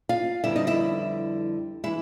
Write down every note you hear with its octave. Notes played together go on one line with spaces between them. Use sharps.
F4 F5
F2 D3 G3 B3 E4 E5
D#4 D#5
E4 E5
E3 G#3 E4 E5